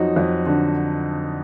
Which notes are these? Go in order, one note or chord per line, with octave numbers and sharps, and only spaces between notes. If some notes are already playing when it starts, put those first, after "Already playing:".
Already playing: F2 F#3 D#4 F#4
F2
D3